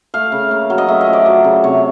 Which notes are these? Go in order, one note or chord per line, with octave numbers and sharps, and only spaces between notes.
A3 F5
C#3
A#3
F#3
D#5
A3 E5
D#5
F3
D5
F#3
C#3
C3 C#5